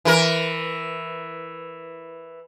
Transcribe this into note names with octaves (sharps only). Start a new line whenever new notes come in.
E3 A#4